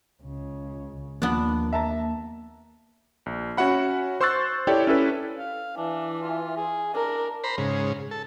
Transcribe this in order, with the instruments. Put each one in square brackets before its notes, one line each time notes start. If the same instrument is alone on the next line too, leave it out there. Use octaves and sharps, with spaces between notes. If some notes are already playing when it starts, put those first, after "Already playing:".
[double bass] C#2 C#3
[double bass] D#2 [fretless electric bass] F3 A#3 [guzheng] B3 D4
[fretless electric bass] A#3 [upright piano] E5 A5 A#5
[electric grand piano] A#1
C#4 F#4 E5 F#5 B5
C5 C6 C#6 E6 F#6 A6
E4 G4 A4 C#5 D5 G5
C#4 E4 A4 B4
[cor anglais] F5
[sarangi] E3 [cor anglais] D4
[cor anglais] F4
G#4
[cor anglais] D4 [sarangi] A#4
[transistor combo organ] C5 A#5 B5
G#2 C#3
A4